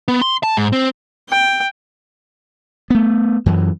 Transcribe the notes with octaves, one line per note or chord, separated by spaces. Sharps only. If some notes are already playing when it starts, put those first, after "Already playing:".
B3
C6
A5
G#2
C4
G5
A3 B3
F#2 E3